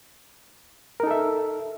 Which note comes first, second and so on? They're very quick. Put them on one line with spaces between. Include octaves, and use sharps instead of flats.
A#4 D#4 A4 E5